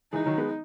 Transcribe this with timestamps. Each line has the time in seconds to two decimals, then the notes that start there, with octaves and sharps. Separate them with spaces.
0.12 E3 G#3 D#4
0.26 D#3 F#3
0.37 G#3 B3